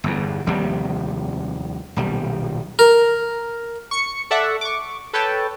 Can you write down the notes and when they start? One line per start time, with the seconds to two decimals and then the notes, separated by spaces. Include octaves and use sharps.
0.04 G1 E2
0.46 F1 D#2 C3 G3
1.96 D#1 B1 G3
2.79 A#4
3.91 C#6 C#7
4.31 A4 D5 E5 F#5 C#6
4.61 C#6 D6
5.13 A4 B4 C#5 G5 A5